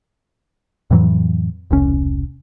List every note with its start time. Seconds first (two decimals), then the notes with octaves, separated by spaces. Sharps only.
0.91 F2 A2 E3 F#3
1.71 E1 C2 C#4